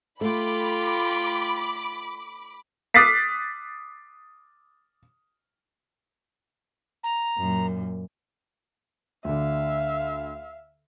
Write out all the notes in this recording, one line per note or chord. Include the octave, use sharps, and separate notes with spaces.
A3 F4 G5 B5 D6
D6 D#6 F#6 A6 B6 C7
A#5
F#2 A#2
D2 D3 E5 F5